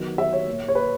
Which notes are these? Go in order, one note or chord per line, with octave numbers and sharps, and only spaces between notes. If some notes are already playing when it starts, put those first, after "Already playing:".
Already playing: D#3 F#3 B3
E5
C#5
A#2 A#3
C#5
B4